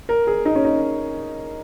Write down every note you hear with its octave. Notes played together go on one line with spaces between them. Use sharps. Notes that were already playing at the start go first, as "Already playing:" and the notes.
A#4
G#4
D#4
C#4
D#4